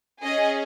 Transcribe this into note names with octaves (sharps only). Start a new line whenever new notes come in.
C#4 G#4 D#5